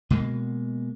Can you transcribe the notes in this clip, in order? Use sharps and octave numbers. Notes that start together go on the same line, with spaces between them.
B2 G#3 A#3